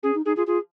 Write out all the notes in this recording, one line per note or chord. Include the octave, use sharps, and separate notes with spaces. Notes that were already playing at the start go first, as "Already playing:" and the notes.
C#4 G#4
D#4
D#4 G#4
F4 G#4
F4 G#4